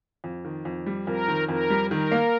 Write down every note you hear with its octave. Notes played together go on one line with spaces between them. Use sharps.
F2
D#3
F2
G3
F2 A#4
D#3
F2 A#4
G3
D#3 A#4
A#3